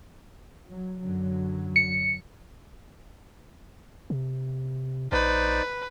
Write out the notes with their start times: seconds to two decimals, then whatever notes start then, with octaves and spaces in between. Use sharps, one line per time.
0.68 F#3
1.00 F#2 D3 F#3
1.76 C#7
4.10 C3
5.12 A#1 D#4 B4 C5 D5